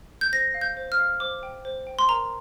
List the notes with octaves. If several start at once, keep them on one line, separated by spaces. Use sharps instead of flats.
G6
C5 A#6
F5
G6
C5
F6
F5
C5 D6
G5
C5
G5
C6
A#4 A#5